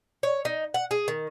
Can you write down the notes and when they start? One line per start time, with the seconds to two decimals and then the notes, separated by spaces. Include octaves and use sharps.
0.23 C#5
0.45 D#4
0.74 F#5
0.91 G#4
1.08 D#3